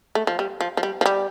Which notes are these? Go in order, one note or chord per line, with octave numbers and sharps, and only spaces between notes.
A3
F3
G3
F3
F3
G3
F3
G3